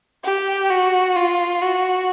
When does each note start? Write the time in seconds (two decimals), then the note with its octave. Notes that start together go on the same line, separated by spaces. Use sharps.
0.25 G4
0.70 F#4
1.16 F4
1.62 F#4